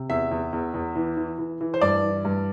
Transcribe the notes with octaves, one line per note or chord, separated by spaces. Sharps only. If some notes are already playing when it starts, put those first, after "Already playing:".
Already playing: C3
E2 E5
E2
E2
E2
E3
E3
E3
E3
C5
G2 D5
E3
G2